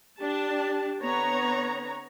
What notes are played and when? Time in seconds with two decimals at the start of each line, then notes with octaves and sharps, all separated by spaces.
0.19 D4 G4 A5
1.02 D3 B3 C4 B4 C#5 A#5